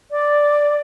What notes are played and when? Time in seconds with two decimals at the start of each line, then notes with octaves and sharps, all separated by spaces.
0.11 D5